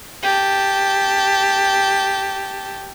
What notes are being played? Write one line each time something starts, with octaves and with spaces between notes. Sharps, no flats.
G4 A5